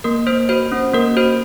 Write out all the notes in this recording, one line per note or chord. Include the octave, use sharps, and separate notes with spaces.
A#3 A#4
A#3 C5
F#4 C5
C#4
A#3 A#4
F#4 C5